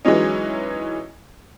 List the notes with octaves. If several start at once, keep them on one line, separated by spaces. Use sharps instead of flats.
E3 F#3 G#3 C#4 D#4